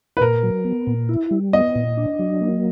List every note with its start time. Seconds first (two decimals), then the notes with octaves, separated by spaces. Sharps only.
0.17 B4
0.21 A#2 A#4
0.43 F#3
0.65 B3
0.87 A#2
1.09 E4
1.31 G3
1.53 B3 D#5
1.75 A#2
1.97 D4
2.19 F#3
2.41 A#3